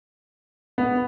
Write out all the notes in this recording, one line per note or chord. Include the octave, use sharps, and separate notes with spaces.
B3